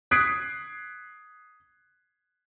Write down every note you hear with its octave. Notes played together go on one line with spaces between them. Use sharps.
D#6 F#6 G#6 B6 C7 D7